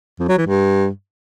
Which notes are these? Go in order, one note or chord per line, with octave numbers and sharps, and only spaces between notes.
F2
F#3
E3
G2